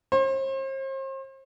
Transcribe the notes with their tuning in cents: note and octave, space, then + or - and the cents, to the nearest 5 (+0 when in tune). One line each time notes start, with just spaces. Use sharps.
C5 +40